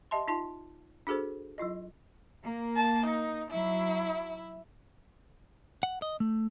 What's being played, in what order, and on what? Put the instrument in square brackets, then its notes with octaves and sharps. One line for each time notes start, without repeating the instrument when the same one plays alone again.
[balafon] G4 D#5 E5 A5 C6
D#4 F4 A5 C6
D4 F#4 G#4 A4 C5
F#3 E4 F4 D#5
[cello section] A#3
[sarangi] A5
D#4
[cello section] F#3 [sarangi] E4
[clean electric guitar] F#5
D#5
A3